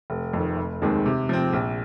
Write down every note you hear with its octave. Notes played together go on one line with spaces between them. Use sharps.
F1
F2 D#3
F1
D#2 D#3 G#3 C4
C3
F3 C4
A#1